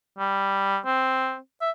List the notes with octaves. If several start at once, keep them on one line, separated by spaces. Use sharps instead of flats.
G3
C4
E5